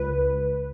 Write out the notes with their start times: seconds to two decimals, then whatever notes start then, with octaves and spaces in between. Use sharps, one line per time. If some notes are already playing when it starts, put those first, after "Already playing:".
Already playing: C#2 B4